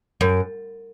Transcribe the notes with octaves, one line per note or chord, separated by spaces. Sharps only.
F#2